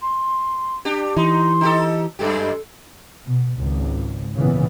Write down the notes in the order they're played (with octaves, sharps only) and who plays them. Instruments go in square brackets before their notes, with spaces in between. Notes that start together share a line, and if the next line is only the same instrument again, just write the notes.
[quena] C6
[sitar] D4 G4
[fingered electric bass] E3 [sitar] D#4 [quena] C6
[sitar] D#4 G4 A4
[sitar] F#2 G#3 G4 [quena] A4
[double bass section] B2
G#1 C#2
A#2 C#3 E3 B3